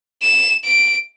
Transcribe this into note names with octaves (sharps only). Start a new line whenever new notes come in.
E7
D7